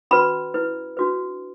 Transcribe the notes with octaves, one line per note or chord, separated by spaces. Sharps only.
C#4 F#4 B4 B5
E4 B4
D4 F#4 B4